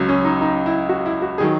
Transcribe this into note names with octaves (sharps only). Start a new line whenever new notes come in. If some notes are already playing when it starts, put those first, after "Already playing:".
Already playing: C#2 C#3 F#3
C#4
D#4
D#4
E4
F#4
E4
F#4
D#3 F#3 G#4